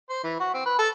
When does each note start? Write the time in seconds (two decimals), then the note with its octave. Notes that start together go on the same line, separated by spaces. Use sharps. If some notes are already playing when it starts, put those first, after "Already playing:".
0.10 C5
0.24 E3
0.40 F#4
0.54 C4
0.66 B4
0.79 A4